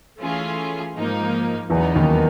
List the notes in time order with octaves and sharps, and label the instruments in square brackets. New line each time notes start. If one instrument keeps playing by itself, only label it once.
[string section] E3 A3 C#4 F4 G#4
G#2 F3 A#3 D#4
[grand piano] E2 E3 [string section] C#3 F#3 B3 D#4
[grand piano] D#2 D#3